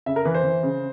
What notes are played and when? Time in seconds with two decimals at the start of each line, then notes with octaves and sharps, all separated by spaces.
0.06 C#3 E5
0.16 A#4
0.25 E3 B4
0.35 C5
0.43 E3
0.63 C#3